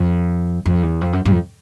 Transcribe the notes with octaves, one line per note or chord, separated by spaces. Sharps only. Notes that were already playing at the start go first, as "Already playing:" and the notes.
Already playing: F2
F2
E2
F2
F#2
G2
F2